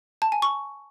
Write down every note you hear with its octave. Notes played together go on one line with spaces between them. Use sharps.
A5
G#5
C#6